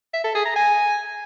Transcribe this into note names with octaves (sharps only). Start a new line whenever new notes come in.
E5
A4
G#4
A#5
G#5